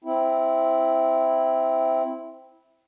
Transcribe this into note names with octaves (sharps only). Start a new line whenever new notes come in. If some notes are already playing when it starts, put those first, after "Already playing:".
C4 E4